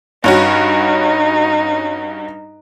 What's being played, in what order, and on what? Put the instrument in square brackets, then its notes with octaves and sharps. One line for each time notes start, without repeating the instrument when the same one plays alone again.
[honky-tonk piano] G2 C#4 F#4 [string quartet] D#4